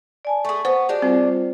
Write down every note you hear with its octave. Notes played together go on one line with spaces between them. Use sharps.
D5 G#5 A5
A3 G#4 C#6
B3 C5
G#3 D4 F#4 G4
G3 C4 F4 C5